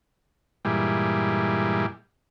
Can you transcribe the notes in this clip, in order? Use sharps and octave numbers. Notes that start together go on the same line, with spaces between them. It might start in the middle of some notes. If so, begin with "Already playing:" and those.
G2 A#2 E3 G3 G#3